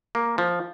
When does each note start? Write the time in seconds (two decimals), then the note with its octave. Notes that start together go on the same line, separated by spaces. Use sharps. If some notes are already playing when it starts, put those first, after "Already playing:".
0.15 A#3
0.38 F3